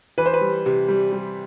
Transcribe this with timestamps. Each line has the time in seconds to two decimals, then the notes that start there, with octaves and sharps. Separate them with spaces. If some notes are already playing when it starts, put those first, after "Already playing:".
0.18 E3 B4
0.26 C5
0.33 B4
0.41 G3
0.66 C3
0.88 G3
1.12 G3